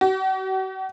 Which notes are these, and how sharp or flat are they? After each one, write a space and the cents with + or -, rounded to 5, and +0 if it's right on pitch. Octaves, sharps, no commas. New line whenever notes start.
F#4 +45